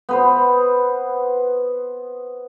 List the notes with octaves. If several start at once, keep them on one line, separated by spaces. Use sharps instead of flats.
B3 B4 C5